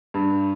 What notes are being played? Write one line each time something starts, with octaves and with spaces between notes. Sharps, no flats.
G2